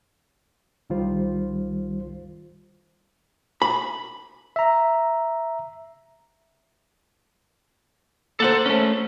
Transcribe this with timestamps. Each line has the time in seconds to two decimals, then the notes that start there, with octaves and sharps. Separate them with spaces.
0.90 C2 D#3 G3 F4 C5
3.62 B5
4.56 E5 A#5
8.40 A#3 A4 C5 F#5
8.66 A3 C#4